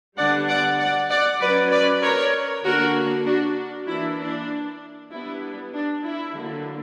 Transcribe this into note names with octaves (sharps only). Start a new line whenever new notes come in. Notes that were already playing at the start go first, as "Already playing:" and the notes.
D3 G3 B3 D4 D5 F#5
D5 F#5
D5 F#5
D5 F#5
F#3 C#4 B4 D5
B4 D5
A#4 C#5
D3 A#3 D4 F#4 A#4
D4 F#4
E3 A#3 D4 E4
D4
G3 B3 D4 E4
D4
E4
D3 F#3 A#3